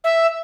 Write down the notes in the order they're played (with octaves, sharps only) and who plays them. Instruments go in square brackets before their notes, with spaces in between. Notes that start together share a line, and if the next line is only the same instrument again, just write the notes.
[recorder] E5